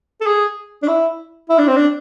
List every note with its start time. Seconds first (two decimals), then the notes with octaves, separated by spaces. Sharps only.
0.21 A4
0.26 G#4
0.83 D4
0.88 E4
1.49 E4
1.58 D4
1.68 C4
1.76 D4